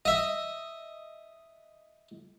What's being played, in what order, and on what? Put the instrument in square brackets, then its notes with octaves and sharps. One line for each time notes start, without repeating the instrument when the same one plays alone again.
[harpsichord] D#5 E5